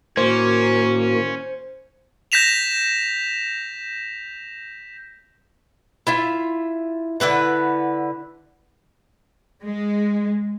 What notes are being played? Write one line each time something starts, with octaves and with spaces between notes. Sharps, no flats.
A2 D#3 A#3 C#4 F#4 C5
G6 A#6 B6 E7 F7
E4 F4 E5
D3 E4 B4 F#5
G#3